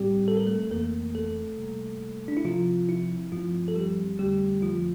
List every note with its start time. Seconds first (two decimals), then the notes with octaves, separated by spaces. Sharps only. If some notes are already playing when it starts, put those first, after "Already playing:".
Already playing: A2 G3 C4 G4
0.28 A4
0.37 A#4
0.47 A3 A4
0.71 F2 E3 A3 A#3 C4 A#4
1.15 A3 A4
1.58 C3 G3 A#3
2.28 D4
2.37 E4
2.45 C3 F3 C4 F4
2.89 E4
3.32 G2 F3 A3 C4 F4
3.68 A4
3.76 G3 G4
4.19 F2 D3 G3 A3 C4 G4
4.62 F3 F4